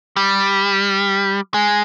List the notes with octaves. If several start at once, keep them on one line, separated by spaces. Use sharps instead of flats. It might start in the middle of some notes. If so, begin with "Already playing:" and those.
G3
G#3